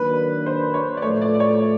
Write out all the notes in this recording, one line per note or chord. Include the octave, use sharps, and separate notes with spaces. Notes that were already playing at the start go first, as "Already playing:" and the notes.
Already playing: D#3 F#3 A#3 D4 B4
C5
C#5
D5
A2 F3 A3 C#5
D5
D5
C#5